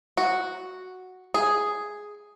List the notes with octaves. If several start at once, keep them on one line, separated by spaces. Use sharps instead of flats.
F#4
G#4